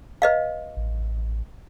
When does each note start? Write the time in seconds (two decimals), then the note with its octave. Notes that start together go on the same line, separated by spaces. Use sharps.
0.22 B4 D#5 F5
0.77 A1